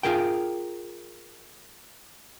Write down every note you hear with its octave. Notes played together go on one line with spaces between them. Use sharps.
F4 G#4 A#4 G5